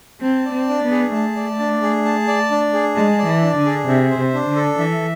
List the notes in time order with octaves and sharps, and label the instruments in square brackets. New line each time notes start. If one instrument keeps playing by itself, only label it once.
[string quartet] C4 [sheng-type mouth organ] A5
[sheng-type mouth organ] D5
[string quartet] C4
[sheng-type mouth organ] D4
[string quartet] B3
[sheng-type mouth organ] G#4
[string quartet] A3 [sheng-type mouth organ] A5
[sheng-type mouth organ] D5
D4
G#4
A5
D5
D4
G#4
[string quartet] G#3 [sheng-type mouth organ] A5
[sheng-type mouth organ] D5
[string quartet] E3
[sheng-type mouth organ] D4
[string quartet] D3
[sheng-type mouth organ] G#4
[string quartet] C3 [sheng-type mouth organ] E5
[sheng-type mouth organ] C5
[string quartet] C3
[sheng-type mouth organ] D4
[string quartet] D3
[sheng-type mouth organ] A4
[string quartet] E3 [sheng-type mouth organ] E5